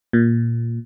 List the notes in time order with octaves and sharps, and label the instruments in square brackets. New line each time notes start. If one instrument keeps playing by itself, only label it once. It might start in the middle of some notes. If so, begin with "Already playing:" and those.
[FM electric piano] A#2